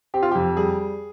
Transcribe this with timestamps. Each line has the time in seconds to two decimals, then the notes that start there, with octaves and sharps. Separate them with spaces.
0.14 C4 G4
0.23 F4
0.31 F2 G4
0.57 G3 G#4